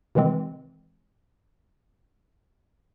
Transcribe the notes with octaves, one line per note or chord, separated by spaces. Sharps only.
C3 D#3 E3 G#3 C4